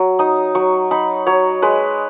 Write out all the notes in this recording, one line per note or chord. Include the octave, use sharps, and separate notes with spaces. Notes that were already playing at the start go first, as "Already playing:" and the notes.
Already playing: F#3
D#4 D#6
F#3 C#6
D#4 B5
F#3 C#5
G#3 B4